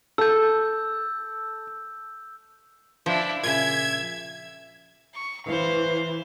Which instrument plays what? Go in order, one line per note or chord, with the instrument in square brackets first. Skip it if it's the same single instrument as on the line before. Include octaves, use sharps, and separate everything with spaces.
[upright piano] A4 [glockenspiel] E6 G6
[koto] F3 [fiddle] D4 E4
[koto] A#2 C#3 [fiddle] E5 [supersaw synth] G#6
[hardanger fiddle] C#6
[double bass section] E3 [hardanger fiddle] C5 F5